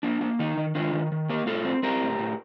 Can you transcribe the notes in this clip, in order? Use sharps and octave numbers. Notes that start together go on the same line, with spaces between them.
A#3 D4
A#3
D#3 D#4
D#3
D#3 D4 F4
D#3
D#3
A#3 G4 A#4
A2 F4 A4
C4
C4 G4 A#4
A2
A2